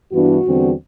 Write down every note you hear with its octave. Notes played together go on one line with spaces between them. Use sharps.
G2 E3 B3 D4 F#4
E2 D3 G3 C4